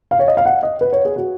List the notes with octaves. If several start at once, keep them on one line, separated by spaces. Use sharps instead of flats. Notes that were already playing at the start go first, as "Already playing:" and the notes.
F5
C#5
D#5
F5
F#5
D#5
B4
C#5
G#4
F#4